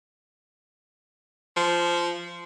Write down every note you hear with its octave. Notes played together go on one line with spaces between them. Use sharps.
F3